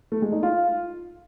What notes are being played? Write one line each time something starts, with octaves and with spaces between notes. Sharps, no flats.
A3
G#3
D#4
F4